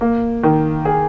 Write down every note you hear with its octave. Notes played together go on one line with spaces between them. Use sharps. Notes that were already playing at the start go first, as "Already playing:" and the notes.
A#3
D#3
G#4